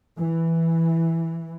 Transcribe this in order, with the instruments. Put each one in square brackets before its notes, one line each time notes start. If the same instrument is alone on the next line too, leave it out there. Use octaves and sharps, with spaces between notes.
[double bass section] E3